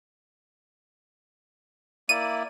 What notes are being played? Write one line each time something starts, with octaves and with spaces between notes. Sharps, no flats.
A#3 E4 D5 D#7